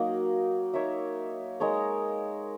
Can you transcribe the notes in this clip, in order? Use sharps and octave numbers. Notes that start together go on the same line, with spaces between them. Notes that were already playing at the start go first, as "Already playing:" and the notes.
Already playing: F#3 A#3 D#4
D#4 A#4 C#5 E5
G#3 D#4 A#4 C#5